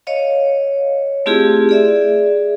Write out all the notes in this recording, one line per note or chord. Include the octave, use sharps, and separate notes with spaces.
C#5 D#5 F5
A3 C4 E4 F4 G4 G#4
G#4 D5 E5